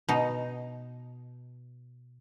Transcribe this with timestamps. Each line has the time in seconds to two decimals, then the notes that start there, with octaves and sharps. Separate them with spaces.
0.09 B2 D#4